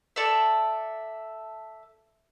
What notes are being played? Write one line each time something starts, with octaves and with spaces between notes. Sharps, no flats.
A4 D5 E5